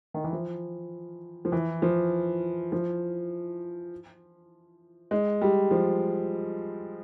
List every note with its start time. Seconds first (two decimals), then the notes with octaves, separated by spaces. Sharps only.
0.14 D#3
0.24 E3
0.33 F3
1.45 F3
1.52 E3
1.82 F3
2.72 F3
5.11 G#3
5.42 G3
5.71 F3